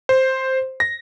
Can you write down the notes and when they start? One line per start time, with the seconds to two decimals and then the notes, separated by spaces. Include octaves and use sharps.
0.09 C5
0.80 A#6